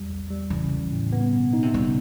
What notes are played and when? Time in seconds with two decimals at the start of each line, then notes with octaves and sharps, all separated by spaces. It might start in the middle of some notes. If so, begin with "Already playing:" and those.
Already playing: E2 G3
0.10 A#1
0.30 G3
0.50 C#3 E3
0.72 A#1
0.92 A2
1.12 B3
1.32 B2
1.53 D#4
1.62 C3
1.74 C#3 G3